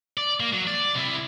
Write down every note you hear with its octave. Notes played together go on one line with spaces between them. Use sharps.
D5
A#3
F#3
D5
C3 E4